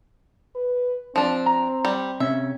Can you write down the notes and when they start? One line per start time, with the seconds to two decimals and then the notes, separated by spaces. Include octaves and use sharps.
0.55 B4
1.16 F3 C4 D4
1.46 A#5
1.85 G3
2.20 C3 C#4 E5